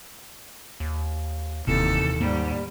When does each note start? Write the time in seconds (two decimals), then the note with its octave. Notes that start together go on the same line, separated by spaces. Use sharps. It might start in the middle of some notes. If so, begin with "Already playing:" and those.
0.80 D#2
1.67 F1 D#2 C3 E3 A4
2.21 G#2 G3 A#3